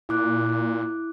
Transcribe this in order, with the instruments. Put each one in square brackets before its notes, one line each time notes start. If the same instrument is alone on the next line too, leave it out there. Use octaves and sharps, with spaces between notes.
[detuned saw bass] A#2 [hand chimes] E4 D6 F#6